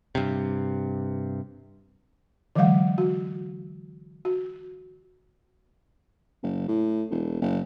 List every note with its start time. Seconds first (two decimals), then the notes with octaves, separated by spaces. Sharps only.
0.15 G2 C3
2.55 D3 E3 F#3 G#3 F5 F#5
2.98 F#4
4.25 F#4
6.43 F#1
6.68 A2
7.10 E1
7.41 F#1